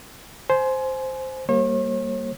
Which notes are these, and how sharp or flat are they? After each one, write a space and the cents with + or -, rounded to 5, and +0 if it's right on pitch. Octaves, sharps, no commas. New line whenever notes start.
C5 +0 G#5 +25
G3 +0 A#3 +0 C#5 -45